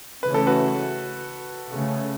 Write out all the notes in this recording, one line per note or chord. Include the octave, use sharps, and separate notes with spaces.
C#3 E3 A3 C#4 B4
A4
F#4 B4
C#3 A3 C#4